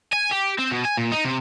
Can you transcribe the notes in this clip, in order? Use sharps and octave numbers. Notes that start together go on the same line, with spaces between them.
G#5
G4
C4
B2
G#5
A#2
D#4
C3